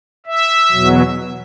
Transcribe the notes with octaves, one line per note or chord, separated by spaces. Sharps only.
E5
E2 B2 F#3